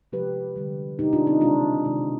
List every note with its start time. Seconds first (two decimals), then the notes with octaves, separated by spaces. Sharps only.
0.12 C3 F3 G#3 G4 B4
0.56 D3 G3
0.99 B2 G#3 D#4 G4
1.13 D4 F4
1.27 C4 D#4
1.41 C3 D#3 G#3 D4 F4
1.84 C3 D#3 G#3